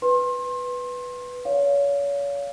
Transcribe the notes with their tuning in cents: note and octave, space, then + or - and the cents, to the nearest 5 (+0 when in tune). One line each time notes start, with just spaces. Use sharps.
B4 +0 C6 +30
C#5 +35 F5 +0